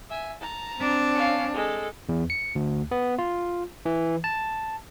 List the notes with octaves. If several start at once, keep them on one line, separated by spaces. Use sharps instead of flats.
E5 G#5
A5 A#5
C4 D4
C#4 F5
G#3 A4
E2
C#7
D2
B3
F4
E3
A5